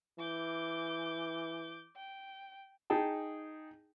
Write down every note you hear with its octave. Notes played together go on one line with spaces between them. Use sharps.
E3 D6 G6
G5
D#4 G#4 G5 A5